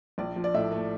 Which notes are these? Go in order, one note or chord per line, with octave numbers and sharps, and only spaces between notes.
A#1 D5
F3
D5
A2 E5
A3